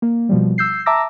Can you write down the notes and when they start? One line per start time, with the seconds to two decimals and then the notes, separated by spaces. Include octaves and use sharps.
0.02 A#3
0.29 B2 F3 G3
0.58 E6 G6 C7
0.86 E5 A5 A#5 D6 E6 A#6